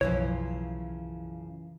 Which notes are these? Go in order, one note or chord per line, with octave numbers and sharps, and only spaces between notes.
B1 F#2 C#3 E3 F3 C#5